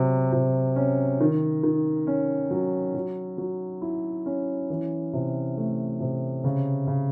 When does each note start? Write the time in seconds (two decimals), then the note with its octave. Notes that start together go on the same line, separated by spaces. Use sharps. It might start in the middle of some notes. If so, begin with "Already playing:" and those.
Already playing: C3 F#3
0.33 C3
0.76 C#4
1.20 D#3
1.63 D#3
2.07 C#4
2.51 F#3
2.94 F#3
3.38 F#3
3.82 E4
4.26 C#4
4.70 E3
5.13 C3
5.57 A3
6.00 C3
6.44 C#3
6.87 C#3